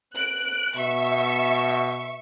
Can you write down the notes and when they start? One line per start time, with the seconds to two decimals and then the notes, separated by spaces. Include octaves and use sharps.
0.14 F#6 D7
0.77 B2 E5 C#6